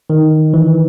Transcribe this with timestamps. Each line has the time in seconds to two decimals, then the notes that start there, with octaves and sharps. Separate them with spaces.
0.10 D#3
0.54 E3